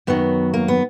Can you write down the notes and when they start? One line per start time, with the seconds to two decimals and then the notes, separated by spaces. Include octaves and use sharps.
0.07 F#2 D#3 F#3 B3
0.54 A#3
0.68 B3